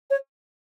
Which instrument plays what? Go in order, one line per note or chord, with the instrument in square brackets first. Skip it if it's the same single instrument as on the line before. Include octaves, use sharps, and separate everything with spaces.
[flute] C#5